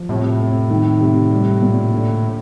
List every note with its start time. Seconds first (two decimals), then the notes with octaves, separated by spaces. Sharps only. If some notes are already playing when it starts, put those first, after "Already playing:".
Already playing: F3
0.09 A2 C3
0.40 F2
0.70 D#3
1.01 C3
1.31 G3
1.62 A#2
1.93 D3